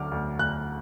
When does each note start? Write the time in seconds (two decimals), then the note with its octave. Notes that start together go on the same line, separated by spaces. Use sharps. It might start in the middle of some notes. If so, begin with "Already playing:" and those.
Already playing: D2 D3 F#3 D6 F6
0.12 D2
0.39 D2 F#6